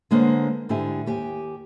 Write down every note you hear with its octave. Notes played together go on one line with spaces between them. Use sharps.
D3 G#3 A#3 B3 C5 C#5
G#2 D3 E4 G4 G#5
D#2 G4 G#5